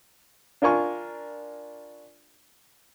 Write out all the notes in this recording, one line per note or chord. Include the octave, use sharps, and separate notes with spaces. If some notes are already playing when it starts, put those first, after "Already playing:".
D4 F4 A#4 G#5 C#6